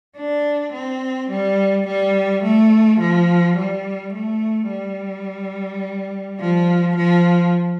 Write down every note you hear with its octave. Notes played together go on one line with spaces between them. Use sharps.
D4
C4
G3
G3
A3
F3
G3
A3
G3
F3
F3